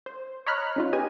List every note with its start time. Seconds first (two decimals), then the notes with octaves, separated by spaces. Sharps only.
0.06 C5
0.46 C#5 D#5 A#5 B5 F6 F#6
0.76 C#4 D#4 F4
0.93 B3 C#4 G4 D#5 G#5